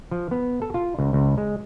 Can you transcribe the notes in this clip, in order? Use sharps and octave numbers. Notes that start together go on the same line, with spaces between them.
F3
B3
A4
F4
C#2
C#2
G#3